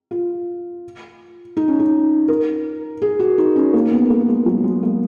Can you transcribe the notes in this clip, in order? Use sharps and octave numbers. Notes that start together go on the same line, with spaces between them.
F4
D#4
C#4
D#4
A#4
G#4
F#4
D#4
C#4
A#3
B3
A#3
G#3
F#3
G#3
A#3